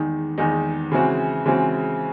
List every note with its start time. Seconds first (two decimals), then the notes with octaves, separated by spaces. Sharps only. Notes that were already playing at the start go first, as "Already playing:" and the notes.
Already playing: E2 D#3 G#3 D#4
0.38 E2 D#3 G#3 D#4
0.92 C#3 E3 G#3 C4 F#4
1.46 C#3 E3 G#3 C4 F#4